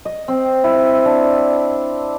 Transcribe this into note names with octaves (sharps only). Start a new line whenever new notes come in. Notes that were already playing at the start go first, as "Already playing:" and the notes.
D#5
C4
E4
D4